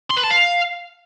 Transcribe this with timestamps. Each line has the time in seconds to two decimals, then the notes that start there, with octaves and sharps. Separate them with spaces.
0.10 C6
0.17 B4
0.23 A5
0.30 F5